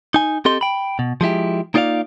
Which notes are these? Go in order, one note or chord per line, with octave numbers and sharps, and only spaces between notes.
D#4 G#5
C4 G4 A4 D#5 C6
G5 B5
B2
F3 G#3 E4 G4
A#3 D#4 F4 D5 E5 F5